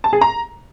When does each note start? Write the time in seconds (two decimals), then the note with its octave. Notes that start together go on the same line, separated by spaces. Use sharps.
0.04 A5
0.13 G#4
0.21 A#5